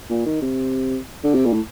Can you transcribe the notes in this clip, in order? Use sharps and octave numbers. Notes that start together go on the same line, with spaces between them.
A#2
D#3
C3
D3
C3
A#2
A2